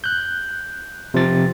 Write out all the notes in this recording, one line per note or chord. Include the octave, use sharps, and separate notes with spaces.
F#6 G6
C3 F3 A6